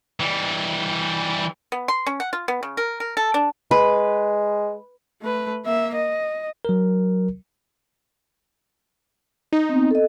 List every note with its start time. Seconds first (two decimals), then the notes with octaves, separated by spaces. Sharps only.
0.20 E3 G3
1.72 B3
1.88 C6
2.06 C#4
2.20 F#5
2.33 F4
2.48 B3
2.63 C#3
2.77 A#4
3.00 A#4
3.17 A4
3.34 D4
3.71 G#3 B4
5.21 A3 B4
5.65 A#3 E5
5.95 D#5
6.65 F#3 A#4
9.53 D#4
9.69 B3 C4
9.91 A4 D#5